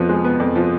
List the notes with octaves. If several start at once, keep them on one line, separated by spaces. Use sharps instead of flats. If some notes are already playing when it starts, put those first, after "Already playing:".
Already playing: F2 F3 B3
G#3
B3
F2
F3